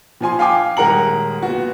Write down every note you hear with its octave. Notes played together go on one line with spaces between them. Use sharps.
A#2 F3 G#5 C6
F5 G5 G#5 D6
D#1 G#3 A#4 F#5 A#5 F#7
A#2 B3 F#4